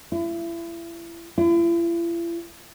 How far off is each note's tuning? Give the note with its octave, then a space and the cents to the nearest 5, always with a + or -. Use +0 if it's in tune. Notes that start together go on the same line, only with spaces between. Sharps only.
E4 +35
E4 +45